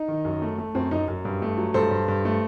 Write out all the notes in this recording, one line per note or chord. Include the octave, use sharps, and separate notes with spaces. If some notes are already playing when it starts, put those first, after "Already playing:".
Already playing: D#4
D#3
F#2
A3
A3
F#2 C4
F#2 D#4
F#2
G2
A3
F#3
G2 A4 C5
G2
G2
A3